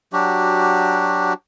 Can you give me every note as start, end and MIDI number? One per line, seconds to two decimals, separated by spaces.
0.13 1.33 54
0.13 1.33 62
0.13 1.33 66
0.13 1.33 67